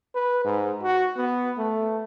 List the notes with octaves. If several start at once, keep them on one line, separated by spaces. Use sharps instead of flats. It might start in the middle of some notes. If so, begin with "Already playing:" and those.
B4
G#2
F#4
B3
A3